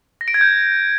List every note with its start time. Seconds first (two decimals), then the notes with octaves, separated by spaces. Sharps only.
0.21 A#6
0.28 D7
0.34 G#6
0.41 G6